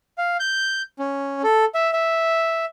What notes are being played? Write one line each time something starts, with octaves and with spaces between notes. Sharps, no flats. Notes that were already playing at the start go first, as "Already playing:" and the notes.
F5
G6
C#4
A4
E5
E5